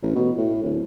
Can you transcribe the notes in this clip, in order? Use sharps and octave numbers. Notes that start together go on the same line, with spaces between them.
A1
B2
A2
D1